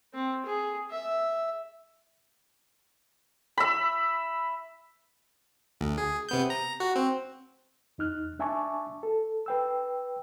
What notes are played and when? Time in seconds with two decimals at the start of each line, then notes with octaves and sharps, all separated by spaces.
0.14 C4
0.46 G#4
0.90 E5
3.58 E5 B5
5.81 D2
5.98 G#4
6.29 C3 B3 G6
6.50 A#5
6.80 F#4
6.96 C4
7.98 E2 D#4 F6 F#6
8.39 D4 E5 G#5 A5 C#6 D6
9.03 A4
9.46 B4 G5 E6